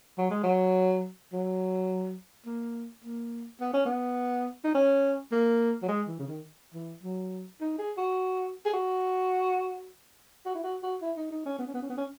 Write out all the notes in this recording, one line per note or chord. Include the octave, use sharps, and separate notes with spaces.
F#3
G#3
F#3
F#3
A#3
A#3
B3
C#4
B3
D#4
C#4
A#3
F#3
G#3
E3
C#3
D#3
E3
F#3
D#4
G#4
F#4
G#4
F#4
F#4
E4
F#4
F#4
E4
D#4
D#4
C#4
B3
C#4
B3
C#4
B3
C#4